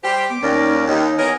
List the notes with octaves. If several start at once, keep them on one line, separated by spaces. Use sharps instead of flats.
G3 G4 C5
B3 D6
D#2 C#4 D#4 A#4 D5
D#2 D#4 C#5
E3 B3 A#4 C#5 D#5 G#5